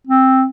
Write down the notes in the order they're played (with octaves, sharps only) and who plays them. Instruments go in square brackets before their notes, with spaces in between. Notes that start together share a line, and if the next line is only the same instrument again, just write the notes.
[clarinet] C4